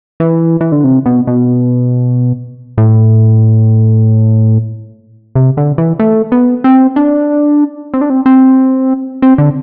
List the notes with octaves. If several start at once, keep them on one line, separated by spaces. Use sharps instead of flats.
E3
E3
D3
C3
B2
B2
A2
C3
D3
E3
A3
B3
C4
D4
C4
D4
C4
C4
C4
D3